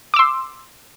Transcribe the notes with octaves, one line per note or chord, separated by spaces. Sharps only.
C6 D6 E6